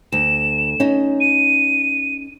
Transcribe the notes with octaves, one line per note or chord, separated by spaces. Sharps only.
D2 E7
C#4 D#4
D#7